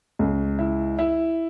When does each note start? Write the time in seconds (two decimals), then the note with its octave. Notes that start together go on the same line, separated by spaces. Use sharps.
0.19 C#2
0.59 E4
0.99 E4